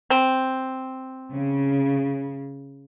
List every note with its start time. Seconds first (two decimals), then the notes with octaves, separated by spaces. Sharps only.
0.10 C4
1.32 C#3